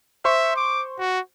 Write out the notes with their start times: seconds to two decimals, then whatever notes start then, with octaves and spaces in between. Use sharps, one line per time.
0.25 C5 E5 C6 C#6
0.56 D6
0.99 F#4